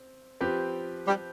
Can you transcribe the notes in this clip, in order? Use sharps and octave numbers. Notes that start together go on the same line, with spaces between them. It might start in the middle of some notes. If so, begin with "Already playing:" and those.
Already playing: C4
F3 C4 G4 B4
G3